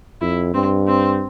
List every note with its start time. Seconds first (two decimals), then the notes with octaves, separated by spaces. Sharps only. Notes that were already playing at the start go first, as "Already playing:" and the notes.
0.21 F2 E4
0.54 G2 C4
0.87 C4